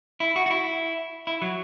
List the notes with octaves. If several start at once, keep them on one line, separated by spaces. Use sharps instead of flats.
E4
F#4
F#4
E4
E4
F#3